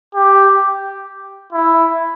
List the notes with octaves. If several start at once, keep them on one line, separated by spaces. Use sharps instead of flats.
G4
E4